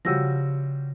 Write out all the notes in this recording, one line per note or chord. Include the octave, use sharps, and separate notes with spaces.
C#3 F3 G3 F#4 E6 A#6